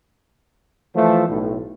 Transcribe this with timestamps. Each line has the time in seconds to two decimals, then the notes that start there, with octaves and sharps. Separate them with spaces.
0.95 E3 F3 A3
1.27 B1 A2